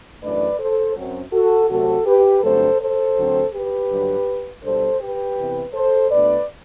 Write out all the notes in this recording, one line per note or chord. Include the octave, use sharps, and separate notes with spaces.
F#2 E3 A3 D4 B4 D5
A4 C5
F#2 F#3 C4
F#4 A4
C3 F#3 A3 C4 F#4 A4
G4 B4
G2 D3 F#3 A3 C4 A4 C5
A4 C5
D2 D3 F#3 C4
G4 B4
G2 D3 F#3
B2 G3 D4 A4 C5
G4 B4
C3 E3 B3
A4 C5
B2 A3 D4 B4 D5